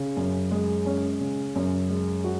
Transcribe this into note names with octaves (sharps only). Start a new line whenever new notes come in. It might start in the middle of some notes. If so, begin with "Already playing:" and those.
Already playing: C#3 C#4
F#2
G#3
C#4
C#3
F#2
G#3
F#4